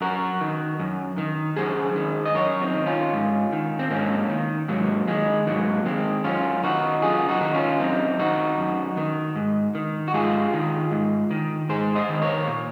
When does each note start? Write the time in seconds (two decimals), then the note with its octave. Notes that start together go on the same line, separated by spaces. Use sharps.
0.01 F#2 F#4 A#4
0.41 D#3
0.80 F#2
1.18 D#3
1.57 F#2 G#4 C5
1.96 D#3
2.25 D#5
2.35 F#2 A#4 C#5
2.61 C4 D#4
2.74 D#3
2.86 C#4 F4
3.13 G#2
3.52 D#3
3.79 C4
3.91 G#2 A#3 C#4
4.30 D#3
4.68 G#2 F#3 A#3
5.08 D#3 G#3
5.47 G#2 F#3 A#3
5.85 D#3 G#3 C4
6.24 F#2 C#4 F4
6.63 D#3 D#4 F#4
7.02 F#2 F4 G#4
7.28 D#4 F#4
7.41 D#3
7.54 C#4 F4
7.80 F#2 C4 D#4
8.19 D#3 D#4 F#4
8.58 F#2
8.97 D#3
9.36 G#2
9.75 D#3
10.08 F#4
10.14 G#2 F4 G#4
10.54 D#3
10.91 G#2
11.31 D#3
11.69 G#2 G#4 C5
11.96 C5 D#5
12.09 D#3
12.22 A#4 C#5
12.47 A#2